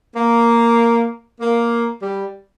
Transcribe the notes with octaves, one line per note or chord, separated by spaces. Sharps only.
A#3
A#3
G3